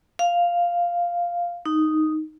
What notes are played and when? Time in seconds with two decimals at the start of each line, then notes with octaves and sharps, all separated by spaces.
0.19 F5
1.66 D#4